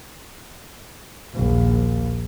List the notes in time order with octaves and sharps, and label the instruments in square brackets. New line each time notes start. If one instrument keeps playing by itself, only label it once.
[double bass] A#1 D#2